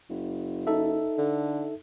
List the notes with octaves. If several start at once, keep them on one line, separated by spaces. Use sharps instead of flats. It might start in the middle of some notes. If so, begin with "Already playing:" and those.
F#1
D#4 A4 E5
D3